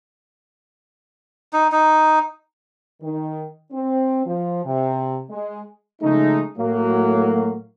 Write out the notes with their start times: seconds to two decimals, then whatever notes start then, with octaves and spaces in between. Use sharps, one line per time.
1.53 D#4
1.72 D#4
3.02 D#3
3.72 C4
4.25 F3
4.64 C3
5.30 G#3
6.02 C#3 F3 G#3 A3 D#4
6.58 A2 F#3 A#3